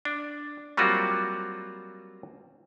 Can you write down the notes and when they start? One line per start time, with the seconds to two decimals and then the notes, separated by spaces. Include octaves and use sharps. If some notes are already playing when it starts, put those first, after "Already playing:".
0.05 D4
0.77 F#3 G3 A#3 C4 F4 F#4